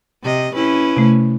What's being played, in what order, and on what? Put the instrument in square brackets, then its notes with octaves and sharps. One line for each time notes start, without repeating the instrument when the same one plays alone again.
[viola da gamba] C3 D#5
C#4 E4 B4
[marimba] C3 A3